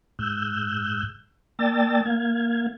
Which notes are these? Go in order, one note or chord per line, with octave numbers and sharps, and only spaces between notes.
G#2 E6 F#6 G6
A#3 D5 G5 A5 E6 A6
A#3 F5 G#6